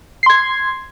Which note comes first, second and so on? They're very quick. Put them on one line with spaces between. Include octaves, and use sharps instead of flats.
C7 C6 G#6